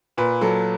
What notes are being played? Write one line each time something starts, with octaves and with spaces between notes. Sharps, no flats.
A#2 B4
F#3 A4